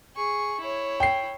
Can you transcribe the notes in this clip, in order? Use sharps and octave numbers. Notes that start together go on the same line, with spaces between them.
G#4 C#6
E4 C#5
G5 C7